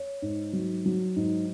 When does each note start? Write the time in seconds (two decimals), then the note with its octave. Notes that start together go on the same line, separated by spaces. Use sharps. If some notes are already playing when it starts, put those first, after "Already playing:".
Already playing: C#5
0.22 G#2
0.53 F#3
0.86 F#3
1.16 G#2